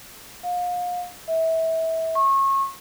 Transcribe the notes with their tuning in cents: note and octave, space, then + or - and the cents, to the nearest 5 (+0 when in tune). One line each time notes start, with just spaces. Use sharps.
F5 +35
E5 -25
C#6 -30